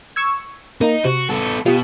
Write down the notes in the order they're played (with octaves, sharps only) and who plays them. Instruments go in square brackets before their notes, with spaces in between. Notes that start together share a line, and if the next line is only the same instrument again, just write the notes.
[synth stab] C#6 E6 G#6
[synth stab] A#3 [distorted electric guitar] D#4
[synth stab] C3 [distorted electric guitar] F#4
[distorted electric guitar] B3 A4
[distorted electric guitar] B2 [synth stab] F4 G4 D#6